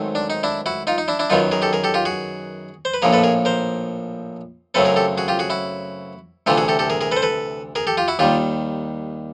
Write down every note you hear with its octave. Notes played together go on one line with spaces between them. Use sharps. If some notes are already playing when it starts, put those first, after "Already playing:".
Already playing: G#2 D#3 F#3 A3 C4
D4
D#4
D4 E4
E4 F#4
D#4 F4
D#4
D4 E4
D4 E4
F#2 D#3 F#3 B3 D#4 F4
G#4 A#4
G4 A4
G#4 A#4
G4 A4
F4 G4
F#4 G#4
C5
B4
A#1 A2 F3 A#3 G#4 A#4
A4 B4
G#4 A#4
A#4 C5
F#2 C#3 F#3 A3 C4 A4 B4
G#4 A#4
G4 A4
F#4 G#4
F4 G4
F#4 G#4
E4 F#4
D2 C3 E3 A3 F4 G4
F#4 G#4
G4 A4
G4 A4
G#4 A#4
G#4 A#4
A4 B4
C5
A4 B4
G#4 A#4
G4 A4
F4 G4
E4 F#4
D#2 D#3 G3 F4 G4